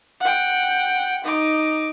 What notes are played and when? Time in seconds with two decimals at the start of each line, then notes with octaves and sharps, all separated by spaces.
0.20 F#5 G5
1.24 D#4 D6